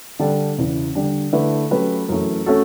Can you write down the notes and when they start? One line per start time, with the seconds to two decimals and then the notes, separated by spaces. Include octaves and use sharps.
0.19 D3 G3 D4 A4
0.58 E2 C#3 E3
0.95 D3 G3 D4
1.33 D3 A3 E4 B4
1.71 F#3 A3 C#4 G4 B4
2.09 F#2 E3 A3
2.46 A3 C#4 F#4 A4